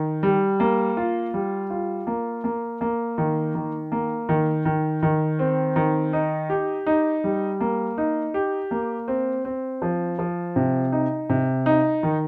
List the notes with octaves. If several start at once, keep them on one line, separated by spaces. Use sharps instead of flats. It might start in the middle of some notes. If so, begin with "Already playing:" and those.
Already playing: D#3
G3
A#3
F4
G3
F4
A#3
A#3
A#3
D#3
D#3
A#3
D#3
D#3
D#3
C4
D#3
D#4
G4
D#4
G3
A#3
D#4
G4
A#3
C4
C4
F3
F3
C3
D#4
C3
D#4
D#3